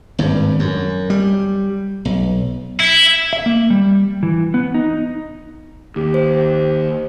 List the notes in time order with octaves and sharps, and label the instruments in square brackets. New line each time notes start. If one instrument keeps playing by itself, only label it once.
[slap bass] G#1 G2
F#2
G3
B1
[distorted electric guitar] E4
[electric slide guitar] E5
A#3
G3
E3
B3
D#4
[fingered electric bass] D#2 [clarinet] G4
[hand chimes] C5